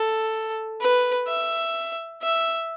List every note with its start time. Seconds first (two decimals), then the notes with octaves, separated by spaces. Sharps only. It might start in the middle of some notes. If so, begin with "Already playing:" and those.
Already playing: A4
0.81 B4
1.28 E5
2.23 E5